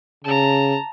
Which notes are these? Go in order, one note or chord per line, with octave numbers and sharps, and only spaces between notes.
C#3 A5 A#5